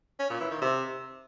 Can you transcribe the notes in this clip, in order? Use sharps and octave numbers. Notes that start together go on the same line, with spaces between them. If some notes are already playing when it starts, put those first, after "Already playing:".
C#4
A#2
E3
D#3
C3